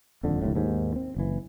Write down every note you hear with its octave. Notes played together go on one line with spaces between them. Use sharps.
D#1 F2 D3
D1 C2 A2
D#2 G#2
C4
F#1 E3